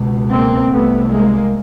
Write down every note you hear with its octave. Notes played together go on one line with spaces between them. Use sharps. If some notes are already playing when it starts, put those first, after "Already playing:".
Already playing: C#2 B2
A#3 C4
C2 C3 A3 B3
G#3 A#3